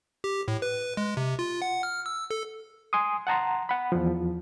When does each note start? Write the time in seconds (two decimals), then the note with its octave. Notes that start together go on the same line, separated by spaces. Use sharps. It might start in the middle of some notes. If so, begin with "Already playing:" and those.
0.24 G4
0.48 A2
0.62 B4
0.97 G#3
1.17 C3
1.39 F4
1.62 F#5
1.83 F6
2.06 E6
2.31 A4
2.93 G#5 C6 D#6
3.27 F#5 A5 A#5 C6
3.69 F#5 B5
3.92 E2 F3